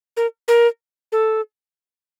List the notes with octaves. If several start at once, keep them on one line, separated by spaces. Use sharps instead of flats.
A#4
A#4
A4